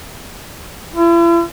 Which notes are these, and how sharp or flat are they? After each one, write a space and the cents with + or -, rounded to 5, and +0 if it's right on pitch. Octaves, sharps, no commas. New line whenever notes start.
E4 +45